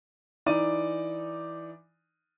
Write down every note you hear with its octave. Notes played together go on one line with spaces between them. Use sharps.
E3 D#4 D5 D6 D#7